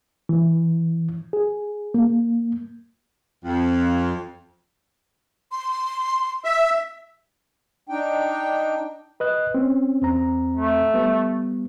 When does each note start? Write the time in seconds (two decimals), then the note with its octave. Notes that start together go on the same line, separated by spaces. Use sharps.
0.29 E3
1.33 G#4
1.94 A#3
3.45 F2
5.52 C6
6.44 E5
7.89 D4 D#4 G5
9.20 B4 D#5 F#6
9.54 C4 C#4
10.02 E2 C4 A#5
10.56 A3
10.94 G3 B3